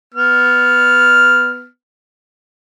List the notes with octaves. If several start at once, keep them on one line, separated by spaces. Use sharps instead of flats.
B3 F6